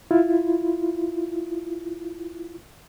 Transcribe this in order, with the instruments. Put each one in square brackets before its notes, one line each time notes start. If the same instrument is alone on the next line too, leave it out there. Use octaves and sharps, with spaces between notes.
[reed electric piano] E4 F4